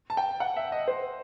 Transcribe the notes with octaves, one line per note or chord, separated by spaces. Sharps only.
A5
G5
F#5
E5
D#5
C5